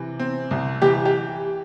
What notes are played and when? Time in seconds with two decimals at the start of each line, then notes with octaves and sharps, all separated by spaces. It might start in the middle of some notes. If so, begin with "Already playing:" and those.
Already playing: C3 E3
0.19 C4
0.51 C2
0.82 E3 G4
1.05 G4